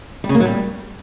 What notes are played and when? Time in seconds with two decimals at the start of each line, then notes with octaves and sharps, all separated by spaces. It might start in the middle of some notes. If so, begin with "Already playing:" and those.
0.24 G3
0.29 C#3
0.35 A#3
0.40 F#3
0.45 G3